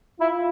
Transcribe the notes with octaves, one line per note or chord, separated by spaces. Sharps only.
E4 F4